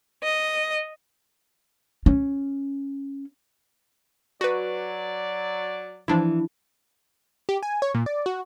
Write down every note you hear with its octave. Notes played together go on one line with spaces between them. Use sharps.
D#5
C#4
F#3 F#4 B4 D5
E3 F3 D4 E4
G4
G#5
C#5
A#2
D5
F#4